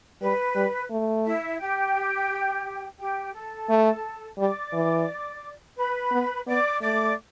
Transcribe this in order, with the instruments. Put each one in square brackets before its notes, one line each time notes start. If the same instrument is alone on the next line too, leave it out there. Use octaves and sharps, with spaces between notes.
[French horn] G3 [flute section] B4
[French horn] G3
A3
[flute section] E4 E5
G4 G5
G4 G5
A4 A5
[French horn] A3
[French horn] G3 [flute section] D5 D6
[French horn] E3
[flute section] B4 B5
[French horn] B3
[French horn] B3 [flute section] D5 D6
[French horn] A3 [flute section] D5 D6